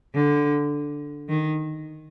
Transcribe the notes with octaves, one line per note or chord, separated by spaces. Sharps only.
D3
D#3